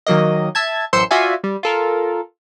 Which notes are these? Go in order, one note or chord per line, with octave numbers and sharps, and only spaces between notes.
D#3 F#3 A#3 D#5
E5 A5 G#6
A1 F#2 C5 C6 E6 C#7
F4 F#4 D5 E5 F5 G#5
G3
F4 A4 A#4